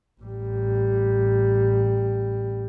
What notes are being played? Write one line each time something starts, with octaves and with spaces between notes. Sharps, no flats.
A1 G3